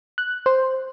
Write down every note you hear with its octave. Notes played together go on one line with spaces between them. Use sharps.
F#6
C5